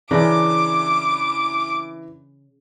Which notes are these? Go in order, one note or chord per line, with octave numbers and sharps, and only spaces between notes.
C#3 E3 D4 A#4 D6